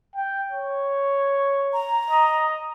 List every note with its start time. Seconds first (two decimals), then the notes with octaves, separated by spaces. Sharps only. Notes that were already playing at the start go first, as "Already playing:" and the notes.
0.15 G5
0.51 C#5
1.73 A#5
2.10 D#5